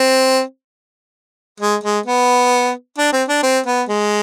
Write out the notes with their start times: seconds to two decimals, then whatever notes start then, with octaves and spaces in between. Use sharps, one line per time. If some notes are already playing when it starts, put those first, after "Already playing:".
Already playing: C4
1.60 G#3
1.83 G#3
2.06 B3
2.98 D4
3.13 C4
3.28 D4
3.43 C4
3.66 B3
3.89 G#3